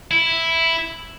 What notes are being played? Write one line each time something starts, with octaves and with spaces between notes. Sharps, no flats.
E4